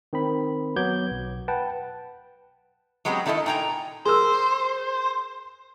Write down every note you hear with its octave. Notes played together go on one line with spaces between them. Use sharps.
D#3 C4 B5
F#3 B3 D6 G6 G#6
B1
B4 F#5 G5 A5
F#3 G#3 B3 C4 G4
D#3 D4 E4 A4 D#5
A#2 D#4 G5 G#5 A#5
G#4 A#4 C5 E6